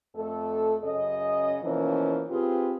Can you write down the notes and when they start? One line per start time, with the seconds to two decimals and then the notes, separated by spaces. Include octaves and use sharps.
0.14 F2 A3 A4
0.83 F#2 C#3 D#5
1.63 B2 E3 F3 A#3 C#4
2.30 C4 F4 G4 G#4 B4